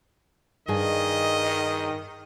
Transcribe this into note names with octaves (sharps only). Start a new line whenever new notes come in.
G2 D#3 G#4 D#5 G#5